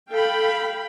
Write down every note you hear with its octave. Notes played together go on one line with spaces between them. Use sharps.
A4 F5 G5 B5